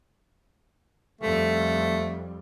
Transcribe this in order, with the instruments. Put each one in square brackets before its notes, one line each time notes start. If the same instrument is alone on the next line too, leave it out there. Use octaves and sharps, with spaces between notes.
[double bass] F2 G3 [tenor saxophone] A3